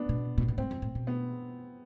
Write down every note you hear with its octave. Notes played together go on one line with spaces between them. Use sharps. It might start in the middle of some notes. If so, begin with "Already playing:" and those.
Already playing: B3 D4
B2
B2
A2
G#2 C4
F2
A2
B2
B3